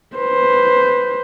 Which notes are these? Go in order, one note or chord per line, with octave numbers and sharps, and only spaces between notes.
B4 C5